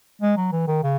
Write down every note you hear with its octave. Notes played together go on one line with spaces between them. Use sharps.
G#3
F#3
E3
D#3
C#3